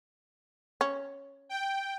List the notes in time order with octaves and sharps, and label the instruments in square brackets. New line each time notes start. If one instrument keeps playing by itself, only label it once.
[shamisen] C#4
[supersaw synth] G5